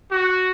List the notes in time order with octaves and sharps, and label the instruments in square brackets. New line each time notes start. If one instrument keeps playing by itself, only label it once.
[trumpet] F#4